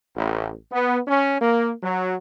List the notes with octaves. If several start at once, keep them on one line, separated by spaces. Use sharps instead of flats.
A1
B3
C#4
A#3
F#3